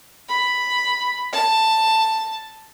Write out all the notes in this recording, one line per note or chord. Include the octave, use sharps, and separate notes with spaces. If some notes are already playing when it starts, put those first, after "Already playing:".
B5
A5